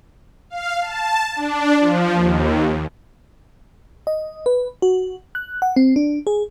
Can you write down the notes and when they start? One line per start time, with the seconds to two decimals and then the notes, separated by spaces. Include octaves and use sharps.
0.50 F5
0.81 A5
1.36 D4
1.80 F3
2.14 D#2
4.07 D#5
4.46 B4
4.82 F#4
5.35 F#6
5.62 F#5
5.76 C4
5.96 D4
6.27 G#4